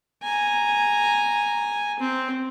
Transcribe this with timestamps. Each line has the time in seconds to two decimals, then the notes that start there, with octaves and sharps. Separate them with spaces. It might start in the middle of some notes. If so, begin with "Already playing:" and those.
0.23 G#5 A#5
1.99 C4